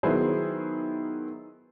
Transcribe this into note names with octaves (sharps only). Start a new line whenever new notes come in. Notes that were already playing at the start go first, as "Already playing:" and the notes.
D#3 F#3 B3 E4 G#4 C5